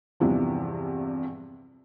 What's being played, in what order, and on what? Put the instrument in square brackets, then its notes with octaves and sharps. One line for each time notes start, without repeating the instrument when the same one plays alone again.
[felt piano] E2 G2 C3 E3 F3